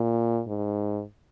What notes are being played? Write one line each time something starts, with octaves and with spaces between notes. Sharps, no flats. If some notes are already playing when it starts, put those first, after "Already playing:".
Already playing: A#2
G#2